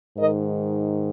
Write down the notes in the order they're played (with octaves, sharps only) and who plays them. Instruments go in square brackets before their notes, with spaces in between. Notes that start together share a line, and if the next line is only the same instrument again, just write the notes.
[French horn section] G#2 D#3 A#4 D#5